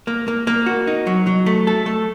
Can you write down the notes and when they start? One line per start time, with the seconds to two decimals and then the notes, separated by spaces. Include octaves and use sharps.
0.07 A#3
0.28 A#3
0.47 A#3
0.66 F#4
0.87 D#4
1.07 F#3
1.27 F#3
1.46 A3
1.67 A4
1.86 A3